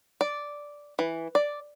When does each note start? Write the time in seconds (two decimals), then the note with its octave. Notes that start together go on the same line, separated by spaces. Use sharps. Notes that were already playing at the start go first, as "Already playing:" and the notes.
0.21 D5
0.99 E3
1.35 D5